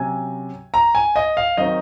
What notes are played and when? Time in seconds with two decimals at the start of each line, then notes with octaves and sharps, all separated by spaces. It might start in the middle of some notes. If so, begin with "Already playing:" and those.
Already playing: C3 F#3 C#4 G#5
0.74 A#5
0.95 G#5
1.16 D#5
1.37 F5
1.57 D#3 F#3 C4 D#4 D#5